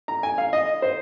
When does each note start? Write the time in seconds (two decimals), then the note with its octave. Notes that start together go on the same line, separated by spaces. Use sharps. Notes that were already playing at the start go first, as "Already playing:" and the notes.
0.08 A#5
0.23 G#5
0.38 F5
0.53 D#5
0.82 C5